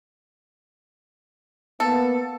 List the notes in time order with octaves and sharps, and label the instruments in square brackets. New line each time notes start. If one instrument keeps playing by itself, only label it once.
[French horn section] A#3 B3 [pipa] A4